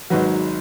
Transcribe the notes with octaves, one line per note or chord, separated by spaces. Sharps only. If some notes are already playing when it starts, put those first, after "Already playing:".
G#1 G#2 F#3 F#4 B4